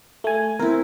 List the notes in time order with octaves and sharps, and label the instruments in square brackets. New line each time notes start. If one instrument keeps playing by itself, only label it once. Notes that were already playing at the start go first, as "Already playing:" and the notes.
[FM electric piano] A3 G#5
[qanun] C4 E4 [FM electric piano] A#4